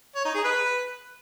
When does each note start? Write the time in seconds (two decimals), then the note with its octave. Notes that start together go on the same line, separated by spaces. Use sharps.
0.15 C#5
0.25 D#4
0.35 G#4
0.44 B4